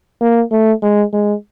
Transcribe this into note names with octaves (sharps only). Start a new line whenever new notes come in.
A#3
A3
G#3
G#3